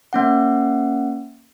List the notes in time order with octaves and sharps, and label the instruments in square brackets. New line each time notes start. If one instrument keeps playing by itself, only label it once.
[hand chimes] A#3 C#4 F#5